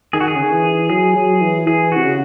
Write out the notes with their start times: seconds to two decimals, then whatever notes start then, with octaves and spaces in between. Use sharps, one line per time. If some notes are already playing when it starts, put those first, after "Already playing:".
0.13 D#3 G#4
0.20 F#4
0.28 G#4
0.35 C#3
0.43 D#3
0.52 E3
0.90 F#3 G#4
1.15 F#3
1.41 E3
1.66 E3 G#4
1.92 C3 F#4
2.05 C#3